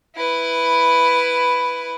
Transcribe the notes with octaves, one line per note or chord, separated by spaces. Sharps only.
E4 B4